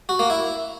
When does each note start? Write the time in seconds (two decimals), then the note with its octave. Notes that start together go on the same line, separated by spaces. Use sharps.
0.09 F#4
0.19 A#3
0.30 E4